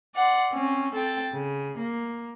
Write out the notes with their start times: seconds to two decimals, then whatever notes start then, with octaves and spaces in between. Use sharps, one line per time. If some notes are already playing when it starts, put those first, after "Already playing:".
0.15 D5 F#5 C6
0.53 C4 C#4
0.94 C4 A4 G5 A6
1.34 C#3
1.78 A#3